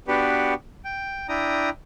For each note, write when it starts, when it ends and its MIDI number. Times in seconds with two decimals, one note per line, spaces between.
0.08 0.54 59
0.08 0.54 62
0.08 0.54 66
0.08 0.54 67
0.08 0.54 71
0.85 1.28 79
1.29 1.70 62
1.29 1.70 64
1.29 1.70 79
1.29 1.70 82
1.29 1.70 87